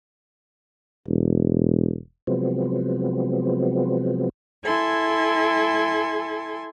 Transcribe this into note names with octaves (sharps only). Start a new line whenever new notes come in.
E1
C3 F3 F#3 G#3 B3 C4
E4 A4 G#5 C6